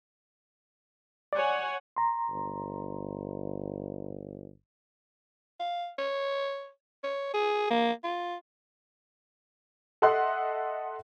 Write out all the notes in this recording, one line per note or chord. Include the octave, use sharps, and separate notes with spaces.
C#5 D5 F#5 G#5
A#5 C6
G1
F5
C#5
C#5
G#4
A#3
F4
A4 D#5 E5 F#5 C6 F#6